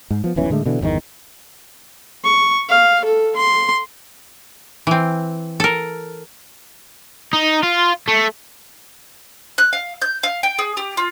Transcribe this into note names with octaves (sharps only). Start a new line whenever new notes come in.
G#2
F3 B3
D#1 B1 E3 C#4
A2 D3 G#3 A3
B2 D3 E3
G1 E2 B2 D#3
C#6
F5
A4
C6
E3 C4
A4 A#4
D#4
F4
A3
F#6
F5
G6
F5
G5
G#4
G4
F4